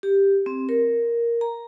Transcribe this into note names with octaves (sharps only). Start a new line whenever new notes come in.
G4
C4
A#4
A#5